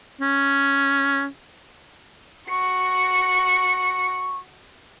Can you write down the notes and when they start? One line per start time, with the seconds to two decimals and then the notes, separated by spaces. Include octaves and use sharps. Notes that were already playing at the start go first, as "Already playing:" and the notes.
0.21 C#4
2.50 F#4 C#6 C#7